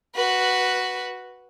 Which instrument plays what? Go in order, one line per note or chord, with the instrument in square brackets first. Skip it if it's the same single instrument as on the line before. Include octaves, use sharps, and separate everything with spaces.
[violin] F#4 B4